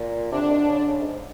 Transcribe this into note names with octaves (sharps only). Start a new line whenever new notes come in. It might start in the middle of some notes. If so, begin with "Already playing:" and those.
Already playing: A#2
C3 D4
D3
D#3
D3
C#3
D3
C#3
G#2